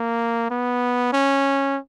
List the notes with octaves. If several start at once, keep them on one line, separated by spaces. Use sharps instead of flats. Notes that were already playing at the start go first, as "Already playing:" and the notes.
Already playing: A#3
B3
C#4